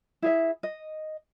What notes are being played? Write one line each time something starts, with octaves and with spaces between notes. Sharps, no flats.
E4 G#4 E5
D#5